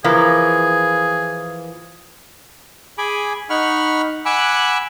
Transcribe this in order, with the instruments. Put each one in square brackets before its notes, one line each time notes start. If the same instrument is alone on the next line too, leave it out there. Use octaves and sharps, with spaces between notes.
[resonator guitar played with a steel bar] E3 F3 A#3 [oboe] G#4
[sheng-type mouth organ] G#4 G#5 B5 D6
D#4 F#5 B5 C#6 F6
F#5 G#5 B5 D6 E6 F#6